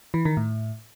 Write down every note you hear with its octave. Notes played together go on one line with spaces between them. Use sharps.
E3
D#3
A2